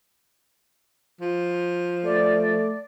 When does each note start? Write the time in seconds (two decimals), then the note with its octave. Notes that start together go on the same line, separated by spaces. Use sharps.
1.21 F3
2.04 A3 D5